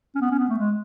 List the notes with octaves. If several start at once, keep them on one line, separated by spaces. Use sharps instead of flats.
C#4
B3
C#4
B3
A3
G#3